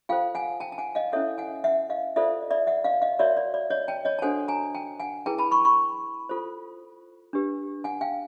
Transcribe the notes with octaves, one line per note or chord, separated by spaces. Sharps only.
F4 A4 C5 F5 G5
F#5 G#5
G5 A5
A5
F#5 G#5
D#5 F5
C#4 E4 A4 C#5 E5 F#5
F#5 G#5
E5 F#5
D#5 F5
F4 A4 C5 D5 E5
D#5
D5 E5
E5 F#5
D#5 F5
D#5 F5
F#4 A#4 C#5 D5 E5
D5
D5
C#5 D#5
G5 A5
C#5 D#5
A5
D4 F#4 A4 C5 F#5 G#5
G#5 A#5
G5 A5
F#5 G#5
E4 G#4 B4 G5 A5
A5 B5
B5 C#6
B5 C#6
F4 A4 C5
D4 G4 B4
F#5 G#5
F5 G5